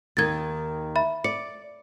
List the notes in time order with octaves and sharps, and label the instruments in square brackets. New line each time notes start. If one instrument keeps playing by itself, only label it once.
[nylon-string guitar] D#2 D#3 [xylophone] G#6 A6
[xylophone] E5 B5
[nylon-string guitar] D5 [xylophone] C#7